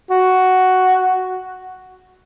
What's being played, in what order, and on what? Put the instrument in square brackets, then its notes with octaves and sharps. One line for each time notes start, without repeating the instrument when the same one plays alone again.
[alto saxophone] F#4